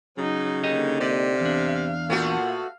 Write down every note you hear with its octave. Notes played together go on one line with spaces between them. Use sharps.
C#3 F#3 D#4
D3 A#3 D#4 G4 D#5
C3 D5
E2 D4 F5
A#2 A3 B3 F#4